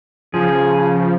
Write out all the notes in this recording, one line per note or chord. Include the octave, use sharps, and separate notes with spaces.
C#3 F3 G#4